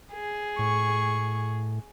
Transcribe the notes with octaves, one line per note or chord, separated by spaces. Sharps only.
G#4
A2 C#6